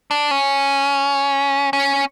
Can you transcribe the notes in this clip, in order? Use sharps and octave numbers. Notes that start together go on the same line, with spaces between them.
D4
C#4
C#4